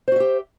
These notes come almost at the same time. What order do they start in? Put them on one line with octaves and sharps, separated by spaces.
C5 F#4 E5 G4